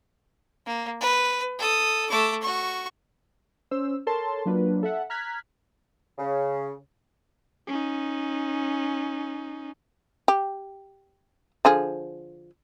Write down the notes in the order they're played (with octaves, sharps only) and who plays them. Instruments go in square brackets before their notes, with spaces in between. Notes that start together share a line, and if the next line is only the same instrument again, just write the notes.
[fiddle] A#3
B4
A4 D#6
A3 D6
F#4 C#6
[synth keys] C#4 C5 E6
A4 A#4 C#5 A5 C6
F#3 A#3 D4 F4 B4
A4 E5 F#5
A#5 F6 F#6 G#6 B6
[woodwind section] C#3
[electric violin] C#4 D#4
[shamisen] G4
D3 F3 G#4